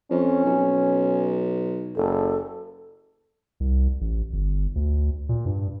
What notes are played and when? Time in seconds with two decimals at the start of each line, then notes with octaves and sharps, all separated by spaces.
0.11 F2 C#4
0.46 B1
1.96 F#1 A4
3.60 C2
4.01 A1
4.33 G1
4.75 D2
5.29 A#2
5.46 G2